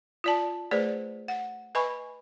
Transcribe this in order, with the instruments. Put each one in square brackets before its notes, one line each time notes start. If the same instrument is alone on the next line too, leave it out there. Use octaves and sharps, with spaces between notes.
[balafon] F4 D5 A5
A3 G#4 B4 C5 D5
F#5
B4 D#5 G#5 B5 C#6